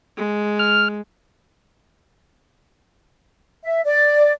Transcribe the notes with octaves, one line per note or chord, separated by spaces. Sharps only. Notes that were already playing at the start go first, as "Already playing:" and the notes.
G#3
F6
E5
D5